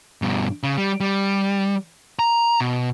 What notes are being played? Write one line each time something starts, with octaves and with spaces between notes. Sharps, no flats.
G2 B2
C#3
G3
G3
A#5
B2